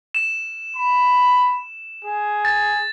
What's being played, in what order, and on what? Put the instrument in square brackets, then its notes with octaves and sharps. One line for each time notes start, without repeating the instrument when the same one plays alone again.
[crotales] E7
[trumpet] B5
G#4
[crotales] A6